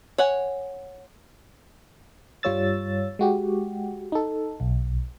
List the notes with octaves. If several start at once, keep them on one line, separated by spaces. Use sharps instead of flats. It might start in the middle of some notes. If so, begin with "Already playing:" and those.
C#5 F#5 G#5
G2 G3 F4 C#5 E6 A6
G#3 F#4 G4
D#4 A4
B1